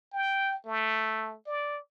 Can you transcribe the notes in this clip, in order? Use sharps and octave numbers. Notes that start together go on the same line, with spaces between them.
G5
A3
D5